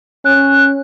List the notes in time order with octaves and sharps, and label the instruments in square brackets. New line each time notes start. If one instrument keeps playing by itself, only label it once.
[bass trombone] C#4 [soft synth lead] F#6